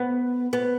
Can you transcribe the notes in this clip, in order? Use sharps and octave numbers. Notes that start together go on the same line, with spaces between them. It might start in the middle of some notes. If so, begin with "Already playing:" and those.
Already playing: B3
B3